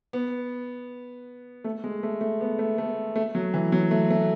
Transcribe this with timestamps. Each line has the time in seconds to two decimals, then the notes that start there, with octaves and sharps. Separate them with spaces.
0.13 B3
1.64 A3
1.84 G#3
2.03 A3
2.21 A3
2.41 B3
2.59 A3
2.78 A3
3.16 A3
3.35 F#3
3.54 E3
3.72 F#3
3.91 A3
4.10 A3